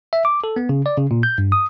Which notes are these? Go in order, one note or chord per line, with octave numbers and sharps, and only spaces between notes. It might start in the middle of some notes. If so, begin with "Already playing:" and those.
E5
D6
A4
B3
C#3
D5
C#3
A#2
G6
G2
D#6